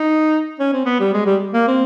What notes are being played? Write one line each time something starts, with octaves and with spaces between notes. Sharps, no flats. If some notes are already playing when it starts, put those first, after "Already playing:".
Already playing: D#4
C#4
C4
B3
G3
G#3
G3
A#3
C4